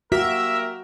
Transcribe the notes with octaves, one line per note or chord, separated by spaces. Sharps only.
A#3 F#4 G4 A#4 E5